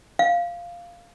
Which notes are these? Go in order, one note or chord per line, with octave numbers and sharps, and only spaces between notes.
F5